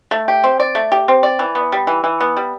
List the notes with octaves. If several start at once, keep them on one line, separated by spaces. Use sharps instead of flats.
A3
G4
C4
D5
A3
G4
C4
D5
E3
B3
G3
E3
E3
B3
G3